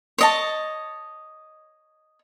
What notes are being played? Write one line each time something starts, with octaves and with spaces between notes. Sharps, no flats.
C#5 D#5 A5